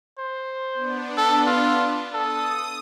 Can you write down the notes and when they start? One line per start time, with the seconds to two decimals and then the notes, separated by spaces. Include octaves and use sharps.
0.18 C5
0.74 B3 D4
1.17 A4
1.46 F4
2.14 A4 D#6